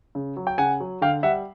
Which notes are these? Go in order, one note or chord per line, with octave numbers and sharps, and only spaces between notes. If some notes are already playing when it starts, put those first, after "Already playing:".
C#3
F#3
G5
C#3 F#5 G#5
F#3
D3 F5 G5
G3 E5 F#5